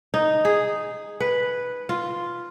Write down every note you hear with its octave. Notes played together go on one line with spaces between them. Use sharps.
D#4
G#4
B4
F4